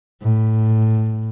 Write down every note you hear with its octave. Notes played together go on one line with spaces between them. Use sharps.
A2